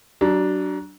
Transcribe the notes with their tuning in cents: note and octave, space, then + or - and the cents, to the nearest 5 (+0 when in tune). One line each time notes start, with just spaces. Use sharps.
F#3 +30 D4 +0